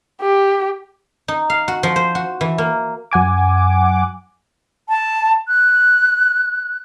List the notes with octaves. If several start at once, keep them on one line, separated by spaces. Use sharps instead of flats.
G4
D#4
F5
F#4
F3
C5
F#4
E3
A#3
F#2 F#5 G#5 D6
A5
F#6